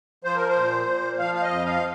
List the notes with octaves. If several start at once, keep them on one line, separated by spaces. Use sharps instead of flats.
F3 C5
A#4
C5
A#2
A#2
F3 F5
F5
D#5
F2
F5